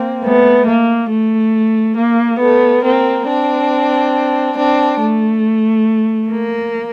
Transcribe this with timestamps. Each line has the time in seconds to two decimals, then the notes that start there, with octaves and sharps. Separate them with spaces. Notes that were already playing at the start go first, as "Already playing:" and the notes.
Already playing: A#3 C4
0.23 A3 B3
0.66 A#3
1.10 A3
1.97 A#3
2.40 A3 B3
2.83 A#3 C4
3.27 C4 D4
4.57 C4 D4
4.99 A3
6.30 A#3